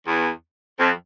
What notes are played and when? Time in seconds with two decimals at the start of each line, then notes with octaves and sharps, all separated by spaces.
0.07 E2
0.80 F2